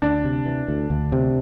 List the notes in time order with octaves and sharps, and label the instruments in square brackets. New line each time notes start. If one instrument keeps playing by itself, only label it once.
[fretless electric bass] D2 [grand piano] D4
[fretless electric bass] C3
E3
D2
D2
C3